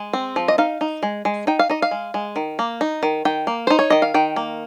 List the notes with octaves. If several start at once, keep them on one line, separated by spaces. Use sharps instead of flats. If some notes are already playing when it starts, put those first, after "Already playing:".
Already playing: G#3
C4
F3
D#5
D#4 F5
D#4
G#3
G#3
D#4 G5
F5
D#4 D#5
F5
G#3
G#3
D#3
A#3
D#4
D#3
D#3 G5
A#3
D#4 C5
C#5
D#3 D#5
F5
D#3 G5
A#3